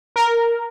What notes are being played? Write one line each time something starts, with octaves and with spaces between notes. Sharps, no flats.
A#4